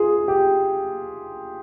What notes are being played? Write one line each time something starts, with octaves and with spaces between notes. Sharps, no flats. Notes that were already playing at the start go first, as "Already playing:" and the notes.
Already playing: F4 G#4
G4